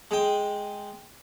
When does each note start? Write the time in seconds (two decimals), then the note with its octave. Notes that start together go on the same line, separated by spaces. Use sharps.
0.11 G#3 G5